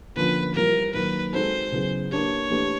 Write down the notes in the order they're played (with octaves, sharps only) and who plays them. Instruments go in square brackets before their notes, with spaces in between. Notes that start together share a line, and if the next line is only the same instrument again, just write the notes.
[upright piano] D3 F3 A#3 C#4 F4 [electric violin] B4
[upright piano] E3 G3 C4 F4 [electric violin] A#4
[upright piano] D#3 F#3 A#3 [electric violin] B4
[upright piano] G#3 C4 D#4 F#4 A4 [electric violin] C5
[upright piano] C#3 F#3 B3 E4 G#4
[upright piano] A#3 D4 G4 B4 [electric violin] C#5
[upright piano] E3 A3 D4 G4 B4